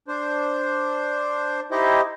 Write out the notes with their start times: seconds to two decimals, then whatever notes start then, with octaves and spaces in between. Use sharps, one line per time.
0.08 D4 C5
1.71 D#4 E4 G4 C5 D#5